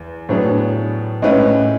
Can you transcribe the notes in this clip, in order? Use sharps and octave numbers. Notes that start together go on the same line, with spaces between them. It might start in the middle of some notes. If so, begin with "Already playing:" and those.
Already playing: E2
A2 F#3 B3 D4 G#4
A2 G#3 C#4 E4 B4